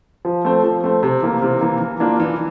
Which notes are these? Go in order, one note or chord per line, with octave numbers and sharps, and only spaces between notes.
F3
A3 C4
F3
A3 C4
C3
E3 A#3
C3
E3 A#3
E3
A#3 D4 F4
E3